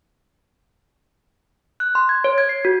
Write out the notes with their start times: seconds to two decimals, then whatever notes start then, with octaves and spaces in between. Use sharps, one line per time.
1.80 F#6
1.95 C6
2.09 G#6
2.24 C#5
2.38 G#6
2.49 C7
2.65 F#4